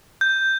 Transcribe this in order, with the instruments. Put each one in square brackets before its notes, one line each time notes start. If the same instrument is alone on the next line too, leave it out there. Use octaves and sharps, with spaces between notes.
[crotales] G6